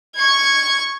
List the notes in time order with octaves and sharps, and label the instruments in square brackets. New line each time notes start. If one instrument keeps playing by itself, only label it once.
[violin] C#6 G#6